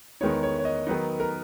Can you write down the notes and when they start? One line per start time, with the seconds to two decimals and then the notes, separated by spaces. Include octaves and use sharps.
0.21 E2 D#3 G#3 B3 D#4 C#5
0.43 C#5
0.59 C#5
0.65 D#5
0.87 D#3 F#3 B3 D#4
1.20 A#4